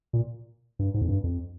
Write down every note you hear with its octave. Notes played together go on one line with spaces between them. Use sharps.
A#2
G2
G#2
F2
G2
F2